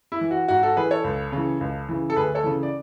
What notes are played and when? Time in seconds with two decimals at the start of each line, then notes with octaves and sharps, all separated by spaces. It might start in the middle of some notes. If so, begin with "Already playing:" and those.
0.12 E4
0.21 E3
0.31 F#4
0.48 G#2 F#4
0.63 F#4 A4
0.77 E3 G#4 B4
0.91 A4 C#5
1.04 C#2
1.32 C#3 E3
1.61 C#2
1.89 C#3 E3
2.10 A4
2.16 D2 G#4 B4
2.35 A4 C#5
2.44 C#3 E3
2.63 D5